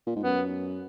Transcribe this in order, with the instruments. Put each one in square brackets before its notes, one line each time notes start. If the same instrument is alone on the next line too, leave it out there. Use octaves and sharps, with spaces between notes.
[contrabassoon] A#2
G#2
[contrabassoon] F#2 [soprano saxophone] B3